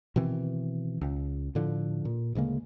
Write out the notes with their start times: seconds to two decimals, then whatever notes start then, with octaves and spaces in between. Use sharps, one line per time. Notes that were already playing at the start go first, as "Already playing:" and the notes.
0.16 B2 D#3 E3 C4
1.01 C#2
1.55 A2 D3 F3
2.05 A#2
2.35 D2 C#3 G#3 A#3